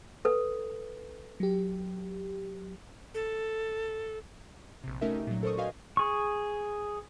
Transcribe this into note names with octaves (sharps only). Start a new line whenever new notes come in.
A4 B4
F#3 G4
A4
A#1 C3
A3 C#4 D#4 F#4 A#4 E5
D#4 G4
A#2 F#3
A4 A#4 C5 D5 C#6 D#6
F#4 B4 C5 D#5 F5 G#5
G#4 C#6